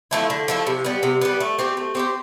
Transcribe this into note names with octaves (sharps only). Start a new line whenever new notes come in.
F3 A3 E4
D3
F3 A3 E4
C3
G3 B3
C3
G3 B3
A3
C4 G4 C5
A3
C4 G4 C5